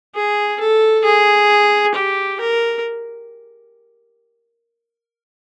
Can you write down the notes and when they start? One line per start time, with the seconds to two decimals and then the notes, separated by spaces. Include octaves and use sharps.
0.15 G#4
0.60 A4
1.04 G#4
1.94 G4
2.40 A#4